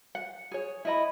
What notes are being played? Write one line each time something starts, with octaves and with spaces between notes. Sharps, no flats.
F#5
G#4 C#5
E4 D#5 B5